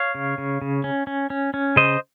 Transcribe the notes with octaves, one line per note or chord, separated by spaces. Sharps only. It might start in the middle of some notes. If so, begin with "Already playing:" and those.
Already playing: C#5 F5
C#3
C#3
C#3
C#4
C#4
C#4
C#4
C#3 C5 D#5